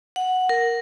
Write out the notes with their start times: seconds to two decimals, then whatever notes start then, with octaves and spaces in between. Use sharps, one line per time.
0.16 F#5
0.49 A#4